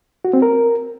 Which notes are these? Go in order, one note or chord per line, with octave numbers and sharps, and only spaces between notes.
F#4
C4
A#4